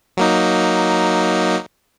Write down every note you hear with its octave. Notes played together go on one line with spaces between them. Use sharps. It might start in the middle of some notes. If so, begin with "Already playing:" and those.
F#3 A#3 D#4